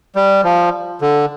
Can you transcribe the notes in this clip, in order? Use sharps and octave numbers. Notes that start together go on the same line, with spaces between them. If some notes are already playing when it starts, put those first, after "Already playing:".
G3
F3
D3